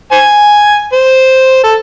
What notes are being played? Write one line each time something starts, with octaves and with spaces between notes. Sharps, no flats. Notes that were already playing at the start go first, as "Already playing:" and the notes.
C5 G#5
C5
A4